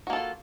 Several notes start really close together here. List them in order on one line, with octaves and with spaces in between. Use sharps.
F#4 A#3 A4 F4